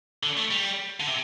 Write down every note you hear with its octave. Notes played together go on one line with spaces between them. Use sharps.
D3
A3
G3
D3
C3